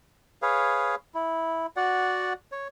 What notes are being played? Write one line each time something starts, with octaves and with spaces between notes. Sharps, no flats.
G#4 B4 C#5 F5
E4
F#4 D5 F#5
C#5